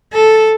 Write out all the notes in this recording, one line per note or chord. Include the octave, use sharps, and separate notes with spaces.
A4